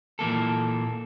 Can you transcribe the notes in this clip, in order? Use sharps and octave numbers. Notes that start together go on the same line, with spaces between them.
A#2 E3 A#3 A4